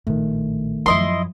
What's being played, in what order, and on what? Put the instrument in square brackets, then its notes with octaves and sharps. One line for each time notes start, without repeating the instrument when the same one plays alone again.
[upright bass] A#1 A2 [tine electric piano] D#3 A3
[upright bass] F#2 F3 [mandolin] E4 D#5 C6